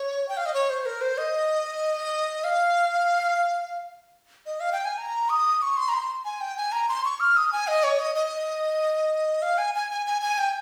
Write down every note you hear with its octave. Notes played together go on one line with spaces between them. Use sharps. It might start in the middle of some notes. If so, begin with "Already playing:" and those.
Already playing: C#5
G5
F5
D#5
C#5
C5
A#4
C5
D#5
F5
D#5
F5
G5
G#5
A#5
D#6
C#6
C6
A#5
C6
G#5
G5
G#5
A#5
C6
C#6
F6
D#6
G#5
D#5
C#5
D#5
D#5
F5
G#5
G#5
G#5
G#5
G#5
G5